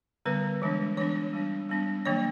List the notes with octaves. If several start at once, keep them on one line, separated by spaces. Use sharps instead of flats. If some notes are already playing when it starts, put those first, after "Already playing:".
D3 G3 B3 B4
E3 G#3 B3 D4
E3 G#3 B3 D4 C#5
G3 B3 D4
G3 B3 D4
D#3 F#3 A#3 D4 C#5